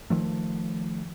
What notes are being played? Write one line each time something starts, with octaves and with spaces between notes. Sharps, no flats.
D#3 F3 A3